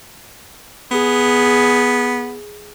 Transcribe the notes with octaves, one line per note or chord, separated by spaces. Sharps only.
B3 G#4